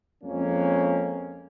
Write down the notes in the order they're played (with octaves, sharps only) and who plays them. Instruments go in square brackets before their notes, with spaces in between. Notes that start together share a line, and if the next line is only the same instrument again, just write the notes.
[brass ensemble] F2 G#3 A#3 C#4